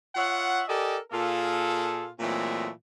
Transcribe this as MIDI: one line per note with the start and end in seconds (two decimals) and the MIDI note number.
0.16 0.62 65
0.16 0.62 73
0.16 0.62 76
0.16 0.62 78
0.68 0.97 67
0.68 0.97 69
0.68 0.97 70
0.68 0.97 74
0.68 0.97 75
0.68 0.97 80
1.11 2.08 46
1.11 2.08 58
1.11 2.08 65
1.11 2.08 68
1.11 2.08 69
2.20 2.69 46
2.20 2.69 52
2.20 2.69 54
2.20 2.69 56
2.20 2.69 57
2.20 2.69 60